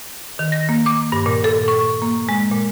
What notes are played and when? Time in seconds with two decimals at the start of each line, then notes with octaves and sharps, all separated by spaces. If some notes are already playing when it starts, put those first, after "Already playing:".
0.39 D#3
0.52 A#6
0.69 A#3
0.86 D6
1.12 G2
1.26 A#2
1.44 A4
1.68 C#6
2.02 A#3
2.29 G#3
2.51 A#2